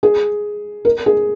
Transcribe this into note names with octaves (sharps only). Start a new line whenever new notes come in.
G#4
A#4
G#4